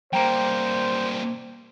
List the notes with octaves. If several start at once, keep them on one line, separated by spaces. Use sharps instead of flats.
G3 A#3 C5 G5 A#5